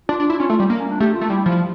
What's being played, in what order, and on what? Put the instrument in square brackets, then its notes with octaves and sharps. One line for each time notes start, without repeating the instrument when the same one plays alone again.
[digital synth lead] D4 [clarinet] F4
[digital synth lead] D4
E4
[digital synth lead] C#4 [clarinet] F4
[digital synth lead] A3
G3
A#3
[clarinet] C#4
D4
[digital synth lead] A3 [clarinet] G4
[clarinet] F4
[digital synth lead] A3
[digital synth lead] G3 [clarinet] E4
[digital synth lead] F3